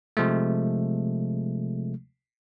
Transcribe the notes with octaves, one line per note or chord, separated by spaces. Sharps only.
C3 F3 G#3 A3